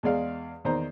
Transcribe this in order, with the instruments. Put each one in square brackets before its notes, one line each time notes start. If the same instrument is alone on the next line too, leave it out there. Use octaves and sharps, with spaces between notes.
[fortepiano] E2 G#3 D5 F5
E2 D#3 C5 D5 A#5